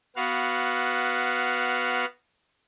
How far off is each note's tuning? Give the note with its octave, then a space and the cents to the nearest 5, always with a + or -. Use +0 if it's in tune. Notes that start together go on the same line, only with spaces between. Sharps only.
B3 +0 F#4 +10 F5 +0